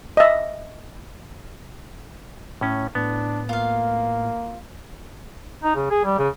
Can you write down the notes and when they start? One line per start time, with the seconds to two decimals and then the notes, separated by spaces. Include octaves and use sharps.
0.17 D#5 E5
2.61 A2 C#4
2.95 A2 B3 D4
3.49 A#3 F4 F5
5.64 D#4
5.75 C#3
5.91 G#4
6.04 G3
6.18 C#3